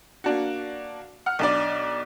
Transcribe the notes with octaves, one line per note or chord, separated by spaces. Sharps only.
A#3 D4 F#4
F#5 F6
B1 D4 D5